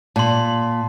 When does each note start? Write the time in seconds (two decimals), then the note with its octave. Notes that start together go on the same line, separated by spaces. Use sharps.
0.16 A#2 A5 C6